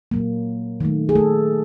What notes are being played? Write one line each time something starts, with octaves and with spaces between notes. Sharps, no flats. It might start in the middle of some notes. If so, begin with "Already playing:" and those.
A#2 F#3 A#3
D#3 F#3 A3
G#4
A3 A4